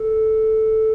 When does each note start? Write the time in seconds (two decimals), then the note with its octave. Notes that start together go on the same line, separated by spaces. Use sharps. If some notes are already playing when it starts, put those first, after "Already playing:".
Already playing: A4